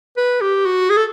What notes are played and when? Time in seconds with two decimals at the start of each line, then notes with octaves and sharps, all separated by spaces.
0.17 B4
0.41 G4
0.65 F#4
0.90 G#4
0.97 A4